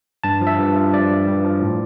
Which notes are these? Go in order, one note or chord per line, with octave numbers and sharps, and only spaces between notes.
G2 A5
F3
E5
G2
F3
G2 D5
F3
G2
F3
A2